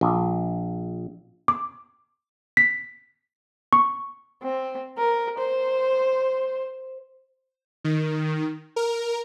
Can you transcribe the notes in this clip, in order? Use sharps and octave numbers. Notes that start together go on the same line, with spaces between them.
A#1
D6
B6
C#6
C4
A#4
C5
D#3
A#4